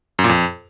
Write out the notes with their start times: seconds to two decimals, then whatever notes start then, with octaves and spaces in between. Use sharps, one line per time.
0.19 F#2
0.24 A#2
0.29 F2